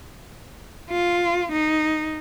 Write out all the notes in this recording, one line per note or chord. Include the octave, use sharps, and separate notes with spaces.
F4
D#4